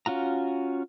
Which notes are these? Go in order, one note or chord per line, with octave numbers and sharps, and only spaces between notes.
C#4 F4 F#4 A#5